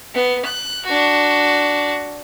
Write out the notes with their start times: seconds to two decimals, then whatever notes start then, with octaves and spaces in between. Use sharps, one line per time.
0.14 B3
0.45 F#6
0.85 D4 F#4